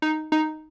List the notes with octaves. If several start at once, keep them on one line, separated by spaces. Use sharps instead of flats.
D#4
D#4